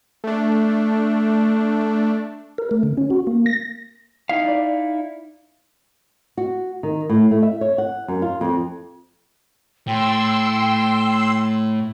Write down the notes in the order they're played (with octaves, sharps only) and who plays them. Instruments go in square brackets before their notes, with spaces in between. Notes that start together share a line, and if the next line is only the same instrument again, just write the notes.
[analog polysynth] A3 D4
[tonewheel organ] A#4
A3
D3
C#4
F#4
A#3
A#6
[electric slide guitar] D#4 E4 F5 [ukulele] D#5
[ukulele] D4 D5
[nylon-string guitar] F#4
D#3
A2
A3
E5
C#5
F#5
F#2
F4
F2
[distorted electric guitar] A2 [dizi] G5 [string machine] C6 E6